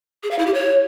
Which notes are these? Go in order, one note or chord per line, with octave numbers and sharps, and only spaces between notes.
G#4
F5
E4
G4
C#5